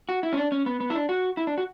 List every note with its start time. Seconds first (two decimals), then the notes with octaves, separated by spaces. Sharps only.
0.09 F#4
0.23 E4
0.33 C#4
0.37 D4
0.52 C#4
0.66 B3
0.80 B3
0.90 E4
0.95 D4
1.09 F#4
1.37 E4
1.47 D4
1.58 F#4